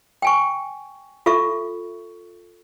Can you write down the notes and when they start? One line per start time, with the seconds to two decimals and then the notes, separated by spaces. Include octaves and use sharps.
0.22 G5 G#5 C#6
1.26 F4 A4 E5 C#6